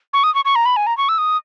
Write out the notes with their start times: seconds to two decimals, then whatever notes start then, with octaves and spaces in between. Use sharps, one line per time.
0.13 C#6
0.23 D#6
0.35 C#6
0.45 C#6
0.55 A#5
0.65 B5
0.76 G#5
0.87 A#5
0.98 C#6
1.09 E6
1.18 D#6